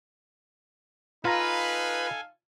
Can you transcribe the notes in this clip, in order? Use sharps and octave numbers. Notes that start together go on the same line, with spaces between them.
D#4 F4 A4 B4 F5 G#5 A#5